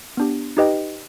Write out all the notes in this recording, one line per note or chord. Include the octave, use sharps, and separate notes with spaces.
B3 D4 G4
D#4 G4 B4 D#5 G5